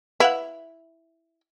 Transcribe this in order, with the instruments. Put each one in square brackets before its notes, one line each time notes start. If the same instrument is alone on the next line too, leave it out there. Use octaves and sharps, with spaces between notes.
[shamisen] E4 [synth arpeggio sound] B4 F5 F#5